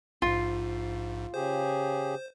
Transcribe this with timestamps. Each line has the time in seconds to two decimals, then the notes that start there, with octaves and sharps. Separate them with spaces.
0.22 A#1 G#2 F4
1.34 C#3 G4 G#4 C5